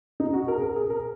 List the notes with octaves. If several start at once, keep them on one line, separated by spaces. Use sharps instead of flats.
D#4
F#4
A#4
G#4
A#4
G#4
A#4